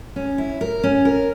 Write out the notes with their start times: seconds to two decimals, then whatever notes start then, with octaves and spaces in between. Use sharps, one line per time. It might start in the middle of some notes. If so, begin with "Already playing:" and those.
0.16 C#4
0.38 E4
0.61 A#4
0.84 C#4
1.05 A#4